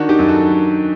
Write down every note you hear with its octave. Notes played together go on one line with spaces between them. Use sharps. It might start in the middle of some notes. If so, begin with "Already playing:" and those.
Already playing: D#3 D4 F#4
D#4 G4
F#2
F#4 A4